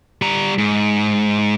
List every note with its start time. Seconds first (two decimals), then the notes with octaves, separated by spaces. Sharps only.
0.22 G3 A#5
0.58 G#2